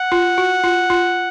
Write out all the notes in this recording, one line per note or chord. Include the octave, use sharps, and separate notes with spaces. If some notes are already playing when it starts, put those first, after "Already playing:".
Already playing: F#5
F4
F#4
F4
F4